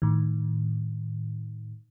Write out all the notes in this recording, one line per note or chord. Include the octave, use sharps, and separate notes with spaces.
A2 D#3